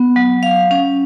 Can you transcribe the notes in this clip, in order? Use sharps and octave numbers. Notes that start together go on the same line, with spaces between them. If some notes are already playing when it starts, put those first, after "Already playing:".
Already playing: B3
F#3
F5
C#4